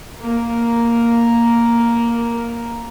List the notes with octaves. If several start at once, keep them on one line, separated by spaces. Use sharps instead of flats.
A#3 A#4